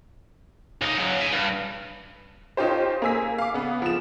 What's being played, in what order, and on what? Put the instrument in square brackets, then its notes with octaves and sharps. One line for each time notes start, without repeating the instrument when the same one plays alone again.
[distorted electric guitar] C#2 D#4
C#3 F#3
E5 G#5
G2
[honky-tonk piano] C#4 D#4 F4 G4 C5
A#3 G#4 G#5 E6 B6
F5 D6
C#3 B3
F3 E7